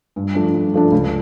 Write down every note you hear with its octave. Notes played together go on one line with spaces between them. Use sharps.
G2
F3 A3 D4
G2
F3 A3 D4
C#2